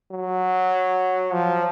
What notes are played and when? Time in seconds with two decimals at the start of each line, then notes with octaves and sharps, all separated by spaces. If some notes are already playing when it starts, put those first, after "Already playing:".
0.11 F#3
1.33 F3